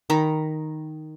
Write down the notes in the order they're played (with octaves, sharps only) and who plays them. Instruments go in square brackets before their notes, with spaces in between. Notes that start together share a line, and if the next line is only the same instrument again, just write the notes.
[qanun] D#3 A#5 B5